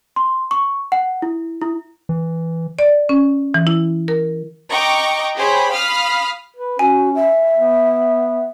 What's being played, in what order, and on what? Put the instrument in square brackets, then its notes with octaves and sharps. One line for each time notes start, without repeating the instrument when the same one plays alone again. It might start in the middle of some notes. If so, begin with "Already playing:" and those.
[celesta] C6
C#6
F#5
E4
E4
[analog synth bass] E3
[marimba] D5
C#4
E3
E4
A#4
[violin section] D#5 G5 A#5 C#6 D6
G4 G#4 C5 C#5 B5
F5 B5 D#6 F6
[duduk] B4
[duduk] C#4 [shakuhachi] F#4 [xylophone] G#5
[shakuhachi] E5
[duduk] B3